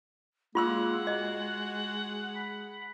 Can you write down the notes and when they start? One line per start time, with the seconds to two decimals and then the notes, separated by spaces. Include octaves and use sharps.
0.55 G#3 A#3 F4 F#5 C6 E6
1.07 F#4 D#5
2.36 B5